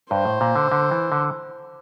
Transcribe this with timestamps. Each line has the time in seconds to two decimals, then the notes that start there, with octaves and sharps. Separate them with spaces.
0.11 G2 C5
0.25 A2
0.41 A#2
0.56 D3
0.72 D3
0.91 E3
1.12 D3